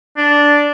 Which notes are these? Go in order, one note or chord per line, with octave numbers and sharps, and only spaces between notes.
D4